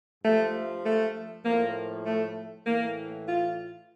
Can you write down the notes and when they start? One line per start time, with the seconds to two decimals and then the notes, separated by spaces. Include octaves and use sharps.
0.23 G2 F3 A3
0.85 A3
1.45 A2 F3 A#3
2.05 A3
2.66 A2 E3 A#3
3.27 F4